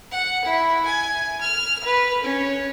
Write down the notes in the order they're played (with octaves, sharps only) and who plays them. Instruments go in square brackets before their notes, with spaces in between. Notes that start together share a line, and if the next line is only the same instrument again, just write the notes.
[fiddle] F#5
E4
G#5
F6
B4
C#4